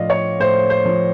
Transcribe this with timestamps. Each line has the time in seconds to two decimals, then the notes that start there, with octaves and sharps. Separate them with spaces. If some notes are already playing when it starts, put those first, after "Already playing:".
Already playing: A2 F3 D5 D#5 F5
0.10 C#5
0.40 A2 C5
0.70 C5
0.85 F3